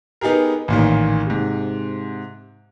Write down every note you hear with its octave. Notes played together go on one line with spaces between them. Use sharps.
B3 D#4 G4 G#4 A#4
A1 A#2 D#3
G#2 C3